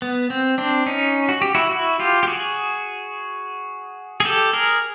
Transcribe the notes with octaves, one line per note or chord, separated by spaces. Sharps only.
B3
C4
C4 D4
C#4 D#4
F#4
G4
E4 F#4
E4 F#4
F4 G4
G4
F#4 G#4
G#4
G4 A4
G#4 A#4